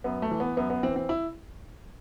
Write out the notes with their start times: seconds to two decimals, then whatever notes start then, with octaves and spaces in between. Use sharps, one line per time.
0.04 F#2 B3
0.22 A3
0.31 E3
0.40 B3
0.57 F#2 B3
0.70 B3
0.83 E3 C4
0.96 C4
1.09 E4